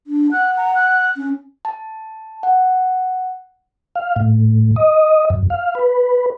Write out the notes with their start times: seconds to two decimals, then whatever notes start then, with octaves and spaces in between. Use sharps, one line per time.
0.07 D4
0.32 F#5 F#6
0.57 A#5
0.75 F#6
1.16 C#4
1.65 A5
2.43 F#5
3.96 F5
4.16 A2
4.76 D#5
5.30 F#2
5.50 F5
5.75 B4